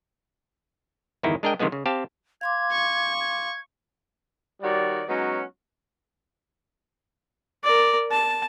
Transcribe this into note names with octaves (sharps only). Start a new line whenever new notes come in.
G1 E2 D#3 D#4 E4
G#3 D4 A#4 D#5 G5
C3 D#3 F3 G#3 B3
C#3
C4 G4 F5 A5
F5 C6 D6 G#6
C#6
G#6
D#3 G3 F#4 C#5 D5
F#3 G#3 B3 C#4 D#4 F#4
A#4 D5
A5